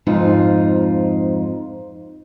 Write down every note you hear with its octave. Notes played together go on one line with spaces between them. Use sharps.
F2 G#2 D#4 F4